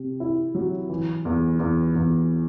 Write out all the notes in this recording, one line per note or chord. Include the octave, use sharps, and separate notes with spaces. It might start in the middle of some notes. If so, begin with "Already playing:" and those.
Already playing: C3
E4
F#3
E3
E2
E2
E2